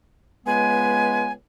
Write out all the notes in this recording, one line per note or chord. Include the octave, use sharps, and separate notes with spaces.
C#2 G#3 B3 B4 G#5